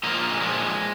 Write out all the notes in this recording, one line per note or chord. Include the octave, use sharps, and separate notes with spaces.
A#2 F3 A#3 D#4
A#3
G#3
A#2 F3 G#3